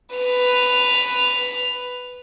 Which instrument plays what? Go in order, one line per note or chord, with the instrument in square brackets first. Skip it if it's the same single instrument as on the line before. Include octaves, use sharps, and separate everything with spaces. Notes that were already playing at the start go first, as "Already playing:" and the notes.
[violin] B4 F7